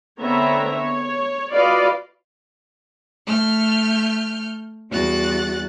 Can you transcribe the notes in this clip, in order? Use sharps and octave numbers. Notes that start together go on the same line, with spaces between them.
D3 B3 C4 C#5 E5 A#5
C#5
F4 F#4 B4 D5 D#5 F5
A3 F6 G6
E2 G3 F#4 F#6 A6